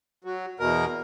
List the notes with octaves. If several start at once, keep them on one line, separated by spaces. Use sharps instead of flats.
F#3
E2 B2 A#4